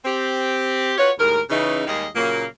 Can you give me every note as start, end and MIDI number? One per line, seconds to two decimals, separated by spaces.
0.05 0.94 60
0.05 0.94 67
0.98 1.11 65
0.98 1.11 66
0.98 1.11 71
0.98 1.11 73
1.19 1.40 39
1.19 1.40 45
1.19 1.40 56
1.19 1.40 70
1.50 1.83 49
1.50 1.83 52
1.50 1.83 63
1.87 2.06 39
1.87 2.06 55
1.87 2.06 56
1.87 2.06 58
1.87 2.06 68
1.87 2.06 75
2.15 2.45 46
2.15 2.45 49
2.15 2.45 54
2.15 2.45 58